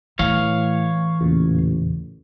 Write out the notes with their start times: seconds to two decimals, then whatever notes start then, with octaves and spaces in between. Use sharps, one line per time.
0.19 A2 E3 C#5 F5
1.21 A1 E2 A#2 C#3